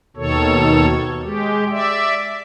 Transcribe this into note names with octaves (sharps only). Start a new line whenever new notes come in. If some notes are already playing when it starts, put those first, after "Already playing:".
D#2 B2 D#3 A4 C#5
G#3 G4
D5 E5